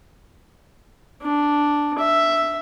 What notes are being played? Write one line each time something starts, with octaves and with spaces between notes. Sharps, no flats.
D4
E5